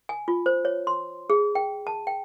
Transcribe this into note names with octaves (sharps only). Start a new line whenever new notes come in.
G#5
F4
C5
C#5
C6
G#4
G5
A5
G5